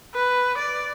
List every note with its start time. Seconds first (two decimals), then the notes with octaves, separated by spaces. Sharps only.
0.14 B4
0.58 D5